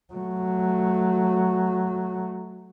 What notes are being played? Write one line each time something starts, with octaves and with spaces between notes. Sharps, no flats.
F#3 A3